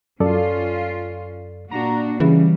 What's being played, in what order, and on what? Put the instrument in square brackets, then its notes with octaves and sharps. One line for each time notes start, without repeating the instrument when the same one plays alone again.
[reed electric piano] F#2 A4 D5 [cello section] C#4 F4
[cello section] A#2 D4 F#4 [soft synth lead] A#5
[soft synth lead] C#3 [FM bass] E3 [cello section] G3